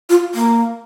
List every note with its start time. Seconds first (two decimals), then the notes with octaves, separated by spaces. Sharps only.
0.09 F4
0.35 A#3